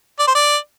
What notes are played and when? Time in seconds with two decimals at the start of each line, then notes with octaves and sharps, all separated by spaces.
0.20 D5
0.28 C5
0.35 D5